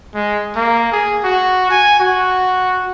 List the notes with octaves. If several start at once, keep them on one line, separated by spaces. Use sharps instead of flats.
G#3
A#3
G#4
F#4
G#5
F#4